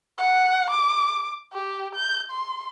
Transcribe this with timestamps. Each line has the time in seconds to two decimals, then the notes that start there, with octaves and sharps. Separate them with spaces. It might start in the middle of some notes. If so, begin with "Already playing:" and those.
0.18 F#5
0.70 D6
1.53 G4
1.95 G6
2.31 C6